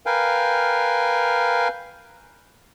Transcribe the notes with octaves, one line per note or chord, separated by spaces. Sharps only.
A#4 B4 F5 G5 G#5